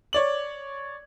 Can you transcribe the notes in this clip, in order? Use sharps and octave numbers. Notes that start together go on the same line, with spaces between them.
C#5 D5 F#7